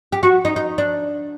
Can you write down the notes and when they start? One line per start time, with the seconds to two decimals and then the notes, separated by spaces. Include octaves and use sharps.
0.12 G4
0.23 F#4
0.45 D#4
0.56 D#4
0.78 D4